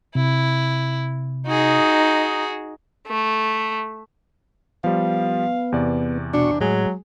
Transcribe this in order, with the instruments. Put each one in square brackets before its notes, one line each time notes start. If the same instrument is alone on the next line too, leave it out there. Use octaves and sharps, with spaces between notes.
[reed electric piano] C3 [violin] E4
[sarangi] D#4 [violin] F#4 G#4
[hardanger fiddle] A3
[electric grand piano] F3 G3 [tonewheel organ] B3 [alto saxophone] F5
[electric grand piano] E2 C3 D5
[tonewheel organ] B2 F#4 C#6 [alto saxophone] D4
[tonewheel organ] A2 [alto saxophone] F#3 [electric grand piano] G#3 G#4 G#5